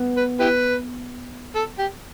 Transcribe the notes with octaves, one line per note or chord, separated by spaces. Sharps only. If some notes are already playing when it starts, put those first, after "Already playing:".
Already playing: B3
B4
E4 G4 B4
A4
G4